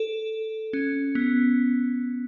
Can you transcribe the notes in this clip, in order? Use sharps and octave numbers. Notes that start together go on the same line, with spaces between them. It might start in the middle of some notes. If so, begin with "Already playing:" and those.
Already playing: A4
C#4
B3